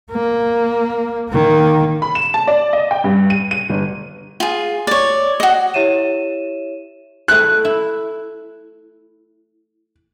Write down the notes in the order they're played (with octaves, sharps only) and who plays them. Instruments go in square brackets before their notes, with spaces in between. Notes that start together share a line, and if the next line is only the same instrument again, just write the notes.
[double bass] A#3
D#3 A#3
[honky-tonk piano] B5
E7
A5
D5
D#5
G5
G2
D#7
D#7
G1
[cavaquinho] F4 G#4
C#5 D5
F#4 D#5
[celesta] E4 G4 C#5 E5 D#7 E7
[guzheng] A3 E4 [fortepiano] F#6
[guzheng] E4